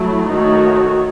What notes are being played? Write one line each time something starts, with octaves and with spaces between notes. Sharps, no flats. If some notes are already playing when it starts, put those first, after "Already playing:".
Already playing: F#3 A3 E4
D#3 A3 D#4 F#4 C#5